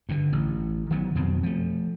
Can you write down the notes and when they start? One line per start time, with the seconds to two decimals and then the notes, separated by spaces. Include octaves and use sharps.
0.09 G2 D3
0.33 A1
0.91 D#3 F#3 A3 B3
1.15 F2 B2 F#3 C4
1.43 F3 A3